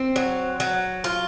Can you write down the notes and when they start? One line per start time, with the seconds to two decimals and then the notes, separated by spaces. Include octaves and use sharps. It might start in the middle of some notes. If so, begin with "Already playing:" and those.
Already playing: C4
0.16 F#3
0.60 F#3
1.04 F4